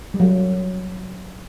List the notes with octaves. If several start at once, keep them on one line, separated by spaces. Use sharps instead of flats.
G3
F#3